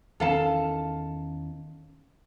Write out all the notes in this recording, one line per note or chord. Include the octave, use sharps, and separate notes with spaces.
E2 D#3 C#4 A4 F5 A5